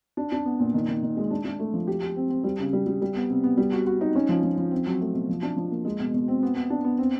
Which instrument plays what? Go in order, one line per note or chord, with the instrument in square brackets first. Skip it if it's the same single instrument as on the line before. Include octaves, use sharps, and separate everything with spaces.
[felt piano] D4
D4
B3
A#2
D#3
D#3
D#3
G#3
D4
D4
A3
F3
G4
G4
C4
C4
G3
C#3
G3
G3
G3
B3
C3
B3
G3
F#4
F#4
D#4
C#4
F3
F3
F3
C4
F#3
A3
B2
F3
D4
F3
A#3
G#3
B2
B2
C4
B3
B3
D4
B3
C4